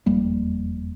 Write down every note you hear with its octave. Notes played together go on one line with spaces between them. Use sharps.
F1 E2 G3 A#3